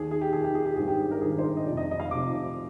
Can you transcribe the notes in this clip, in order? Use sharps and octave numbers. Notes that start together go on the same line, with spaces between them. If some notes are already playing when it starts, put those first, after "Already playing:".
Already playing: D#2 D#3 G#4
G#4
G4
D#2 D#3 G#4
G4
G#4
G4
G#1 G2 D#3 G#4
G4
A#4
G#1 G2 D#3 G#4
C5
A#4
D#5
F1 F2 C3 D5
D#5
D#5
F5
F1 F2 C3 D6